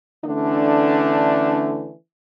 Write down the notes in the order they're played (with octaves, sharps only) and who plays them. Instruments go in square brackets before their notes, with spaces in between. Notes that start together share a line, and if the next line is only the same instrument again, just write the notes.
[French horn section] D3 E3 A3 C#4 D4